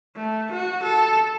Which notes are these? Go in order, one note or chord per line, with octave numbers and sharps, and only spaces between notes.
A3
F#4
A4